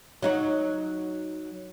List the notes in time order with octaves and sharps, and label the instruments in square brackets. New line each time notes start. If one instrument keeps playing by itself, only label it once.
[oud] F#3 D#4 F#4